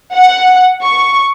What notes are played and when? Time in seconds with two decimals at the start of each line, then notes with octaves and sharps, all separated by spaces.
0.13 F#5
0.83 C#6